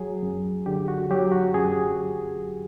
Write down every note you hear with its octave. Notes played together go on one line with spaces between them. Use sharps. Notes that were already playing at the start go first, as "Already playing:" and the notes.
Already playing: F#3 G#4
F#2
D3 G4
F#4
F#3 G4
F#4
F#2 G#4